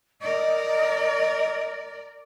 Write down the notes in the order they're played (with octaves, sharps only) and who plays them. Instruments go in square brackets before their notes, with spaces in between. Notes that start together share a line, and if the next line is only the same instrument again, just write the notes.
[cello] A#4 D5 [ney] D#5